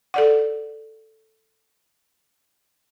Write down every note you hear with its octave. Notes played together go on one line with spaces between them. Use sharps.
A4 D5 F#5